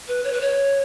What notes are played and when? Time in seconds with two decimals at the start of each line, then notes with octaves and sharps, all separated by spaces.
0.08 B4
0.24 C#5
0.33 B4
0.41 C#5